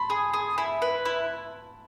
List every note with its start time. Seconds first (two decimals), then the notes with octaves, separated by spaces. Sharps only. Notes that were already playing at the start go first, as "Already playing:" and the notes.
Already playing: A5 B5 C6
0.10 G#4
0.33 G#4
0.58 E4
0.82 B4
1.05 E4